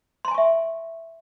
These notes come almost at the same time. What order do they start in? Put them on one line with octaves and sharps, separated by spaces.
C6 A#5 G#5 C#6 E5